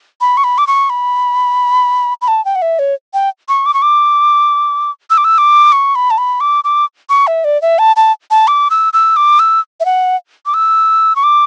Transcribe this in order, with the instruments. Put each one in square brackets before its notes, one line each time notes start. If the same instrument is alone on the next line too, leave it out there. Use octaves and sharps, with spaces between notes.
[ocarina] B5
C#6
B5
D6
C#6
B5
B5
A5
G5
F#5
E5
C#5
G5
C#6
D6
C#6
D6
E6
D6
E6
D6
C#6
B5
A5
B5
D6
D6
C#6
E5
D5
E5
A5
A5
A5
D6
E6
E6
D6
E6
E5
F#5
D6
E6
C#6
D6